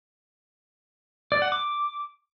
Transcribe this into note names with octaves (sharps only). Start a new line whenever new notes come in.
D5
F#5
D6